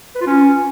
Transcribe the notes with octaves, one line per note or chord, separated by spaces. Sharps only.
B4
F4
C#4